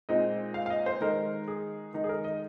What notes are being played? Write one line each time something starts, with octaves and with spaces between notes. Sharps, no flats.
A#2 G#3 C4 D#4 D#5
F5
F5
D#5
C5
D#3 G#3 D#4 A#4
G#4
D#3 G#3 D#4
G#4
A#4
D#5